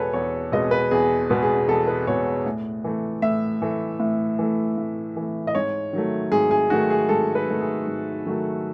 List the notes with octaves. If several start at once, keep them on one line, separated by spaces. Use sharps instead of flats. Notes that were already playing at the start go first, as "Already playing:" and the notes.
Already playing: E2 B2 G#3 B3 A4 B4 C#5
E2 C#5
B2 G#3 B3 D#5
B4
E2 G#4
B2 G#3 B3
G#4
E2 A4
B4
B2 G#3 B3 C#5
A2
E3 A3
A2 E5
E3 A3
A2
E3 A3
A2
E3 A3
D#5
G#2 C#5
D#3 F#3 A3
G#2 G#4
G#4
D#3 F#3 A3 F#4
G#4
G#2 A4
B4
D#3 F#3 A3
G#4
G#2
D#3 F#3 A3